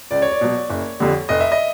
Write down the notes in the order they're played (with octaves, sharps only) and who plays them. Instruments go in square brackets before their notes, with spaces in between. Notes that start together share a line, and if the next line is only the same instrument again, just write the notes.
[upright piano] C#2 [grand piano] D5
[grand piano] C#5
D5
[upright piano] B2 F#3
F#1
F2 D3 G3
[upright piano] F1 [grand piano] D#5
[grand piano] E5
D#5